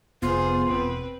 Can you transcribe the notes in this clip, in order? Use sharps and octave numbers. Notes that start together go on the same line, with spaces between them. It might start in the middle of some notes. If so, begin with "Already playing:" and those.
F1 F2 B3 F4 G#4 C5
E1 B2 C4 B4